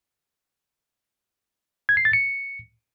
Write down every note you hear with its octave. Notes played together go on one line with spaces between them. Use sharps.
G#6
C7
A6
C#7